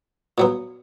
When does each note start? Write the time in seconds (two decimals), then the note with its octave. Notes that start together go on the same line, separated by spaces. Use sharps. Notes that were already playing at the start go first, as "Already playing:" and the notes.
0.38 A#2 F#3 B3